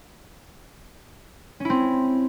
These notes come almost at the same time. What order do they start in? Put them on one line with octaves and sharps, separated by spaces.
C#4 E4 C4